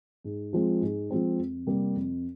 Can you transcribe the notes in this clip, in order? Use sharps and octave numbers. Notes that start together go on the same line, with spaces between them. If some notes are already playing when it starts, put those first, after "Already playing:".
G#2
F3 G#3 C4
G#2
F3 G#3 C4
F2
C3 G3 A#3
F2